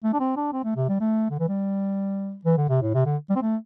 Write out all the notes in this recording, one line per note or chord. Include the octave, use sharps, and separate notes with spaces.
A3
D4
C4
D4
C4
A3
C3
G3
A3
D3
E3
G3
E3
D3
C3
A2
C3
D3
G3
C4
A3